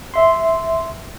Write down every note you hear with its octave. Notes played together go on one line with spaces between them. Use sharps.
E5 C6